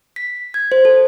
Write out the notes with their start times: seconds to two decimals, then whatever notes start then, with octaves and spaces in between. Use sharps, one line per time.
0.16 B6
0.54 G#6
0.72 C5
0.85 A4